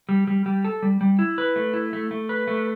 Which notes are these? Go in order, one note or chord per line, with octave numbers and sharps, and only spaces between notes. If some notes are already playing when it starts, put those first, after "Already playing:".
G3
G3
G3
A4
G3
G3
E4
B4
A3
E4
A3
A3
B4
A3